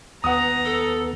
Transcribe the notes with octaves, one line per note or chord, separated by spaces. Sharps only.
D#2 B3 F#5 A#5 D#6
A4